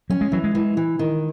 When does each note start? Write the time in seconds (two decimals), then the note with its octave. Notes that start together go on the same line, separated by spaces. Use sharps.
0.10 F#3 C#4
0.21 G#3
0.32 E3 F#3
0.44 G#3
0.55 E3
0.77 E3
0.99 D#3